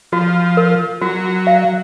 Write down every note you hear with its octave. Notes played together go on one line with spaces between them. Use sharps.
F3 F#4
A#4
F#3 F#4
F5